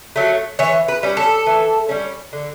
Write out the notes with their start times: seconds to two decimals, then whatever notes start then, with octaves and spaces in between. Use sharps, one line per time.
0.16 F#3 A3
0.59 E3 C#5
0.88 B4
1.03 G3 C#4
1.17 A4
1.47 E3
1.89 G3 C#4
2.33 D3